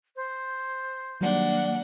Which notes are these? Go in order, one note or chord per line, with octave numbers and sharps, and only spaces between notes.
C5
D#3 F#3 G3 A#3 D4 F#5